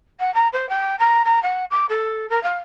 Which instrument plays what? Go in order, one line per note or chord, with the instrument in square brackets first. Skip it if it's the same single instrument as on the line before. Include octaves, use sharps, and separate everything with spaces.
[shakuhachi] F#5
A#5
C5
G5
A#5
A#5
F#5
D6
A4
A#4
F5